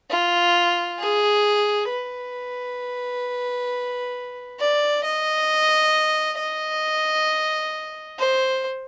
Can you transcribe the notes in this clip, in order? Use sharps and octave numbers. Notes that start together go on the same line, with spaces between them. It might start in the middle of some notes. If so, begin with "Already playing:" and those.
F4
G#4
B4
D5
D#5
D#5
C5